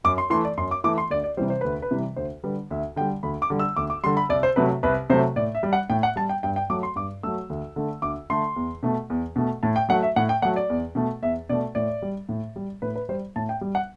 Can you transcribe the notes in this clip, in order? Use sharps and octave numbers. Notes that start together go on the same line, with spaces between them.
F#2 D6
C6
E3 A3 C6
D5
F#2 C6
D6
E3 A3 D6
C6
D2 D5
D5
C3 E3 G3 C5
C5
D2 B4
B4
C3 E3 G3
D2 C5
D3 G3 B4
D2 E5
D3 G3 G5
D2 B5
D6
D3 G3
E6
D2 D6
D6
D3 G3 C6
B5
C2 D5
C5
C3 F#3 A3 B4
C2 B4
C3 F#3 A3 C5
A2 D5
E5
G3
F#5
A2 G5
F#5
G3 A5
G5
G2 G5
G5
F#3 A3 D6
C6
G2 D6
F#3 A3 E6
D2
D3 A3
D2 D6
D3 A3 C6
E2
B2 A3
E2
B2 A3
A2 A5
G5
F#3 A3 F#5
E5
A2 F#5
G5
F#3 A3 F#5
D5
E2
B2 A3
E2 E5
B2 A3 D5
A2 D5
G3
A2
G3
A2 B4
B4
G3 C5
A2 A5
G5
G3
F#5